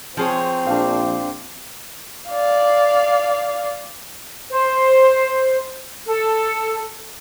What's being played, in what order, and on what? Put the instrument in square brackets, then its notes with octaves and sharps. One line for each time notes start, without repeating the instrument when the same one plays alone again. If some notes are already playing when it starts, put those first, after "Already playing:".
[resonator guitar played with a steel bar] F3 G#4 C#5 [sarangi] C4
[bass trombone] A#1 [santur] D4 F5
[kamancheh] D5 F5
[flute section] C5
A4